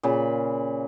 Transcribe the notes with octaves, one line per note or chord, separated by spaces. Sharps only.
A#2 C#3 A#3 B5